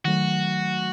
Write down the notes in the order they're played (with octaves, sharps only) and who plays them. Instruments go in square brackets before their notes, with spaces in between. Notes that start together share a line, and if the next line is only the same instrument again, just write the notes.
[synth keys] D#3 F#3 A3 [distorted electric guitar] F#4